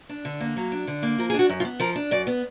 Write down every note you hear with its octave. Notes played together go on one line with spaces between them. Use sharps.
D4
D3
A#3
F#3
D4
D3
A#3
F3 A#4
G#4
D4 F#4
F#2
F4
B3
F3 A#4
D4
F#2 D5
B3